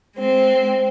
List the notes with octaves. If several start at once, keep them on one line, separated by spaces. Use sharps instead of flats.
G#3 C4